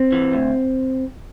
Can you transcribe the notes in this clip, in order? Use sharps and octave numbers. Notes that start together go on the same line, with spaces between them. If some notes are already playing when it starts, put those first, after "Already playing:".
Already playing: C4
E3
D2